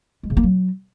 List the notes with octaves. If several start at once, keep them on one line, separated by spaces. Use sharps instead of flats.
G#3
C#3
A#3
F#3